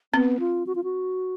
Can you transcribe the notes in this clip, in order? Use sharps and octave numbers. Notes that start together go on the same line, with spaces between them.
B3 C4
F4
F#4
F4
F#4